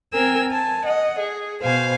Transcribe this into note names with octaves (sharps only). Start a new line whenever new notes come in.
C4 A#4 G#5 E6
G#5 A5
D#5 F#5
G#4
B2 C5 F5 G#5